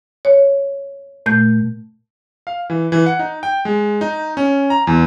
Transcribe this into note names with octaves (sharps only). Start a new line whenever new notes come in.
C#5
A#2 A3 G6
F5
E3
E3
F#5
D#4
G5
G#3
D#4
C#4
A#5
E2